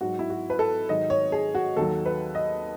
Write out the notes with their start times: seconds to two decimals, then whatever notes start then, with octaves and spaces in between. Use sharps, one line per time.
0.01 G#2 F#3 F#4
0.19 E4
0.30 F#4
0.50 B4
0.59 A4
0.89 G#2 D#3 F#3 D#5
1.10 C#5
1.32 G#4
1.55 F#4
1.77 D#2 D#3 F#3 A4
2.06 B4
2.35 D#5